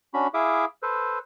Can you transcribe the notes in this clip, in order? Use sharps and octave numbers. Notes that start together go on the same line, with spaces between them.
C#4 D4 F#4 B5
E4 G#4 E5 F5 D6 D#6
A4 B4 C5